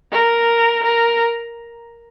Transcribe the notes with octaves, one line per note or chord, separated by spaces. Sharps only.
A#4
A#4